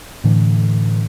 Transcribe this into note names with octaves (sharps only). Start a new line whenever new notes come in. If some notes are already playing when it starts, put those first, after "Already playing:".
A2 D3 E3